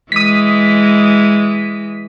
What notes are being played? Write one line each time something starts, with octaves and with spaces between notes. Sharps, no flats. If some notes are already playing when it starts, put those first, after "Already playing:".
E3 G#3 D#6 B6